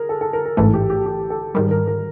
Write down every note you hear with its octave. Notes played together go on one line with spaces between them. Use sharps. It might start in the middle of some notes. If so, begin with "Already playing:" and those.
Already playing: G#4 A#4
A4
A4
A#4
A#4
A1 G#2 E3 A3 A4
G4
G4
G4
A4
G#2 D#3 G3 A#4
A#4
A#4